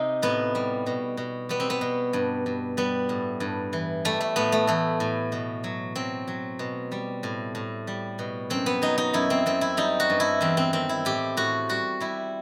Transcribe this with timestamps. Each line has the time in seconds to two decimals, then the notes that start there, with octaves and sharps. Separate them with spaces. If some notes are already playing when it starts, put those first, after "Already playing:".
Already playing: C3 D#4
0.22 A2 B3
0.55 G3
0.86 B2
1.17 B2
1.49 G3 B3
1.60 C4
1.70 B3
1.81 B2
2.13 G2
2.46 G2
2.77 G3 B3
3.09 A2
3.40 G2
3.73 E3
4.05 G3 A3
4.21 A3
4.36 A2 B3
4.52 A3
4.67 E3 A3
5.00 A2
5.32 B2
5.64 F#3
5.95 F#3 C4
6.28 F#3
6.59 B2
6.92 G3
7.23 A2
7.55 A2
7.87 G3
8.19 B2
8.50 F#2 C4
8.66 B3
8.82 F#3 D#4
8.98 D#4
9.14 F#2 E4
9.30 C4
9.46 F#2 C4
9.61 E4
9.77 G3 D#4
10.00 F#4
10.10 G2
10.20 E4
10.41 E2 C4
10.57 C4
10.73 D#3 C4
10.89 E4
11.05 A2 G4
11.37 A2 F#4
11.69 G3 F#4
12.00 G3 E4